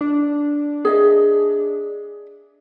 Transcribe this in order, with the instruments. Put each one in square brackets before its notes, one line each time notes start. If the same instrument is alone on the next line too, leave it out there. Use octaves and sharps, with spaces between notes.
[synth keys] D4
[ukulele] G#4 D#5 E5